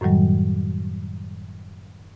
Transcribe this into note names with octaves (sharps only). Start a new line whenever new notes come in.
F#2 A2 D#3 F#3 G3